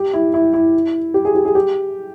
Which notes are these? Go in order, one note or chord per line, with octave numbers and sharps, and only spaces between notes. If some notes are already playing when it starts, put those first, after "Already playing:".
Already playing: G4
E4
E4
E4
G4
G#4
G4
G#4
G4